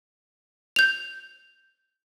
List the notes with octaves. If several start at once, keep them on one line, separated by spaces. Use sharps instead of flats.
G6 F7